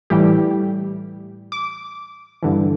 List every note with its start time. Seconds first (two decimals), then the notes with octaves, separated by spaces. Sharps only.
0.10 A2 E3 G3 G4
1.52 D6
2.43 G2 D3 E3